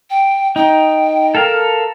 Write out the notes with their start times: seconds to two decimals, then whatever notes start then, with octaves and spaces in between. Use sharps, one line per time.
0.10 G5
0.56 D#4 G5
1.35 A4 A#4 F5